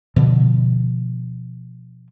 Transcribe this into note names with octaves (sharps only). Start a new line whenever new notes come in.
B2 D3 F3